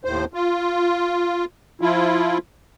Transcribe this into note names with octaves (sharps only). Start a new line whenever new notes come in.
D#2 A2 C5
F4
F3 E4 F4